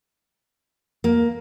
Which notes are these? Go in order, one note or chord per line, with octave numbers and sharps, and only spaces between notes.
A#3